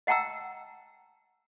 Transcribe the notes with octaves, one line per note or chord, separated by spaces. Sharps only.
D#5 F#5 G5 A5 A#5 E6